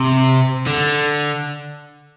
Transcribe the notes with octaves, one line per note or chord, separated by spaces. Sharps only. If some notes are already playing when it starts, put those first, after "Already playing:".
Already playing: C3
D3